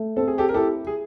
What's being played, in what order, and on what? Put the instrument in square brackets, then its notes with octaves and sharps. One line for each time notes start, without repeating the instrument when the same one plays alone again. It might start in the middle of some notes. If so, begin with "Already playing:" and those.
Already playing: [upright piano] A3
[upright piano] C4 [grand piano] A4
[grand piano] G#4
G4 A4
A#4
[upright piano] E4 [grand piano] G4 A4
[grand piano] G#4